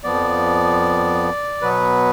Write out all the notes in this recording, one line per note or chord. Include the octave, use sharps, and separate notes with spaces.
F2 F3 B3 D5
B2 F#3 B3 B4